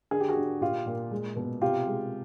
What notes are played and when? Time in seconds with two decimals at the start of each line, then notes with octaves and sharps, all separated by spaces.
0.11 D3 G#4
0.20 G4
0.28 F#4 G#4
0.36 D3
0.61 A#2 F4 G4
0.86 A#2
1.11 G#3
1.36 B2
1.62 C3 F4 G4
1.87 G#3